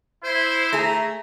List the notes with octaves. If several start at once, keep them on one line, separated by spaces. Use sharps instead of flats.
E4 C5
A3 G#4 A#5